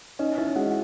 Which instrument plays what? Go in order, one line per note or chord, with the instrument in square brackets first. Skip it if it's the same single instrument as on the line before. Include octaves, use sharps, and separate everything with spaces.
[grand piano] C#4 [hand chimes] D#4 D#5
[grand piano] C#4 [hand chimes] E4 E5
[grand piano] G#3 [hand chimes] F#4 F#5